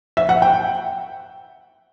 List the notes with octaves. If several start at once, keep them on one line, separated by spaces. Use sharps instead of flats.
E5
F#5
G5